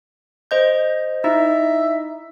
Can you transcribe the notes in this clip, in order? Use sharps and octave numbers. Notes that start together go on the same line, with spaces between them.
C5 D#5 G6
D#4 E4 D#5 E5